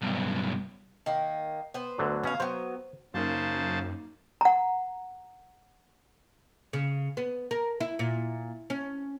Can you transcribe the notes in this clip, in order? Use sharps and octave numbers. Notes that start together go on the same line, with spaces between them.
B1 G2
D#3 A#3
B3 C5
D2 D3 F#3
B2 C#4 F#4 F5
F#3 B3 C5
F#2 C#3 A#3 D#4 C5 A5
F#5 A#5
C#3
B3
A#4
E4
A#2
C#4